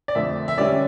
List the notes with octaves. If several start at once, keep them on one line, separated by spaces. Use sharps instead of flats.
D5
F2 D3 A3 E5
E5
D3 G3 C#4 D5